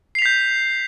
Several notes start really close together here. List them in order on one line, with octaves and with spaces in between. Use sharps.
C7 F7 B6 G6